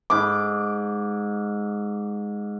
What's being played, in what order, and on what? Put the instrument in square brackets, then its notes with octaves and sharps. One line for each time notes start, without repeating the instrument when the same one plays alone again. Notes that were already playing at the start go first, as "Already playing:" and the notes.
[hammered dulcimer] G#2 D6